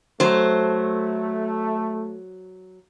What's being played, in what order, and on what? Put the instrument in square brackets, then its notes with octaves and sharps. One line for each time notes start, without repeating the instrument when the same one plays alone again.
[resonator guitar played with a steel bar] F#3 C5 [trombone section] A3